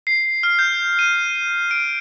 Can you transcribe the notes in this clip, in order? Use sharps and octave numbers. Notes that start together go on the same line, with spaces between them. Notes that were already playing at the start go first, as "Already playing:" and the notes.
C7
F6
G6
D#7
D7